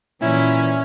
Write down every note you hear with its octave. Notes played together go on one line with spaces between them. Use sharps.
A#2 E3 C#4 E4